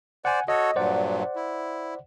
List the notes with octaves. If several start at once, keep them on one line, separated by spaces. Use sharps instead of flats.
C5 D5 F#5 G#5
F#4 A4 C#5 D#5
G2 A#2 F#3 C5 D5 F#5
E4